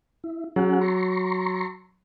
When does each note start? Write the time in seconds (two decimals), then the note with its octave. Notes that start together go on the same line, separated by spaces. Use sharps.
0.24 E4
0.56 F#3 C#4 G#4 F#5
0.81 A#5 C6 C#6